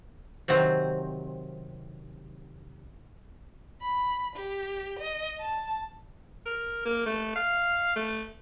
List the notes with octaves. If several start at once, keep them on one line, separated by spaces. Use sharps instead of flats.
C3 D#3 F#3 C4
B5
G4
D#5
A5
A#4
A#3
A3
F5
A3